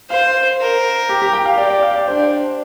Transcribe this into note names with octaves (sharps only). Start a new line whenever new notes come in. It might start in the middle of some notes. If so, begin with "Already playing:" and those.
C5 F5
A#4
G4
G4
G5
F5
G4 D5
D5
F5
D5
D4 C5